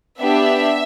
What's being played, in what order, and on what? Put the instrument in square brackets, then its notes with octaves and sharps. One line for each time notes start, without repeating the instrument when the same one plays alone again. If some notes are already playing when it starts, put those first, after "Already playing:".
[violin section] B3 D4 G4 E5